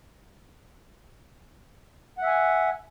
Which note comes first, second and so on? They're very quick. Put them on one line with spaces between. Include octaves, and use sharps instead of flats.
F#5 E5 G#5